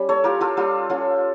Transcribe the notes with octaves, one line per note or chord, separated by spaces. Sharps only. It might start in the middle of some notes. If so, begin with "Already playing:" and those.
Already playing: G3 C#4
A4 C#5
F4 G4 A#4
F4 A4
G3 F4 A4
C#4 F4 A4